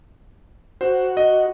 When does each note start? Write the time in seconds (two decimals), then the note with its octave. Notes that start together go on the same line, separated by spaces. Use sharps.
0.81 F#4 C5
1.17 D#5